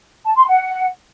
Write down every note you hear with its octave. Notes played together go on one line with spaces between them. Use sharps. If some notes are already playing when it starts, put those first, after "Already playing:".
A5
C6
F#5